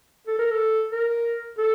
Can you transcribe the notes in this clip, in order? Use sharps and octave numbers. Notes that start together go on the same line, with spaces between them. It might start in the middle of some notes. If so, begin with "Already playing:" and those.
A4
A#4
A4
A#4
A4